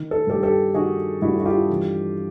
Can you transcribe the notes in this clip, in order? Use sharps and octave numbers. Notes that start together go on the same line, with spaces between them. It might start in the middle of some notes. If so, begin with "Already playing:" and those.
Already playing: D#3
A4
G2 G4 A4
G4 A4
D#3 F#4 G#4
G2 E4 F#4
F#4
F4 G4
E3